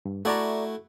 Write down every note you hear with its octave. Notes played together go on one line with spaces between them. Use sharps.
G2
A3 E4 F#4 A4 D5 A#5